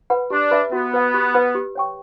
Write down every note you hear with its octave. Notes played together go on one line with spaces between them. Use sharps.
B4 F#5 B5
D4 G4
B4 E5 B5
B3 F#4
B4 F#5
G4
B4 F#5 B5
G4
C#5 G5 C#6